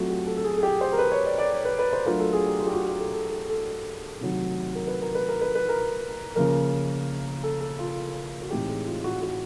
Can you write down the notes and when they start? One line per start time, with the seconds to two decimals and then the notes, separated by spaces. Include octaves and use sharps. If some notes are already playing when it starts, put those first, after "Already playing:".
Already playing: F#3 A3 C4 F4 F#4
0.09 G4
0.27 A4
0.37 A4
0.44 G#4
0.58 G#4
0.63 G4
0.81 C5
0.93 A#4
0.98 B4
1.12 C#5
1.26 D5
1.38 D5
1.53 C#5
1.65 B4
1.79 B4
1.93 C5
2.06 F#3 A3 D4 F4 A#4
2.20 A4
2.33 G#4
2.46 G4
2.60 F4
2.66 G4
2.73 F#4
2.87 G4
2.99 A4
3.13 A4
3.31 G4
3.50 A4
4.20 C3 D#3 F#3 A3
4.75 A#4
4.87 B4
5.02 A#4
5.15 B4
5.29 A#4
5.41 B4
5.55 B4
5.69 A#4
6.36 C#3 F3 A#3 A#4
7.43 A4
7.60 A4
7.79 F4
8.42 F#4
8.50 A2 E3 G#3 C4 D#4 G4
8.69 G#4
8.86 F4
9.04 F#4
9.22 F#4